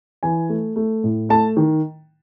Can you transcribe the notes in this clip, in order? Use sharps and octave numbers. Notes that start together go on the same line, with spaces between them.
E3 G#5
A3
A3
A2
A3 A5
D#3